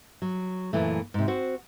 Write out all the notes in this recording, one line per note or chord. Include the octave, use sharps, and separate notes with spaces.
F#3
F#2 A#2 E3 A3
G#2 C3
C4 F#4 C5